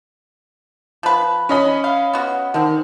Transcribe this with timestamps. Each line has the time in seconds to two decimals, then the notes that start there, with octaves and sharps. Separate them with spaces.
1.03 F3 B4
1.49 C#4 D#5 B5
1.84 F5
2.13 B3 F#4
2.54 D3 D#3 C4